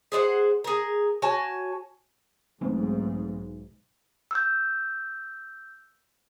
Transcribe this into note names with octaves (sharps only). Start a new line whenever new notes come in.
G#4 C5 D5 F#5
G#4 A#4
F#4 C#5 G#5 A5
B1 G#2 E3 A3 C4
E6 G6